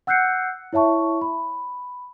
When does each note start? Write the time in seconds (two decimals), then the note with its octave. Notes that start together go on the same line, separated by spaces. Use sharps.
0.07 F#5 E6 F#6 G6 C7 C#7
0.73 E4 C#5 E5 A5 C#6
1.22 B5